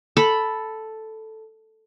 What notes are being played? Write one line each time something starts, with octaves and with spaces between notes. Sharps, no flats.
A4 B5